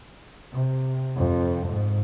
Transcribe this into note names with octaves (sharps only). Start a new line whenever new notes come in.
C3
F2
G#2